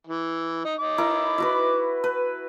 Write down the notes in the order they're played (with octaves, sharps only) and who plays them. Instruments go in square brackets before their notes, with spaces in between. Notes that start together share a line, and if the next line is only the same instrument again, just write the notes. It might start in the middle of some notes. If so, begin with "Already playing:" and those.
[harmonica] E3
D#4
D#4 D6
[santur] E4 A#4
E4 F#4 B4
B4